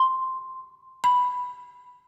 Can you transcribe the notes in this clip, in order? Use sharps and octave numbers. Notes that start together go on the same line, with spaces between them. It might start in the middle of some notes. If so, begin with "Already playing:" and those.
Already playing: C6
B5